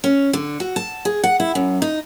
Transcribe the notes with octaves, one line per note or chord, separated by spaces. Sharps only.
C#4
D3
F#4
A5
G#4
F#5
E4
F#2
D#4